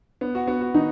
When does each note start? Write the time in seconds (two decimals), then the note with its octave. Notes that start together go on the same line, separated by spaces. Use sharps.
0.21 B3
0.35 F#4
0.47 B3 F#4
0.61 F#4
0.74 D#3 D#4